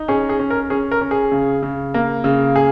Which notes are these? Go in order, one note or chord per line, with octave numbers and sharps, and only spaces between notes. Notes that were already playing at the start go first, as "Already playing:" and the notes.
Already playing: D#4
C#4 G#4
G#4
C#4
A#4
C#4 G#4
A#4
C#4
G#4
C#3
C#3
A#3
C#3
G#4